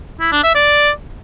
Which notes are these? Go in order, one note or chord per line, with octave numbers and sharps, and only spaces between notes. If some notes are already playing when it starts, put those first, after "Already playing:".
E4
D4
E5
D5